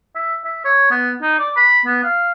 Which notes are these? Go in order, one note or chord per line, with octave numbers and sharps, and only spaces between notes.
E5
E5
C#5
B3
D#4
D5
B5
B3
F5